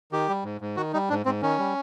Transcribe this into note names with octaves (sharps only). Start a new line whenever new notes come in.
D#3 G4
G3
G#2
G#2
D#3 F#4
G3 D#4
G#2 D4
G#2 C4
D#3 C#4
G3